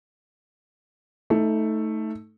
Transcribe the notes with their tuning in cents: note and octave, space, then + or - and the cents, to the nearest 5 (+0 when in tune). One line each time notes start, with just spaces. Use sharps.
A3 +0 D#4 +20